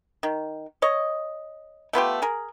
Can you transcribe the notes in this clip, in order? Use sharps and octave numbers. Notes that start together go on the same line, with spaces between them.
D#3
C#5 D#5
A3 B3 F4 G4
G#4 A#4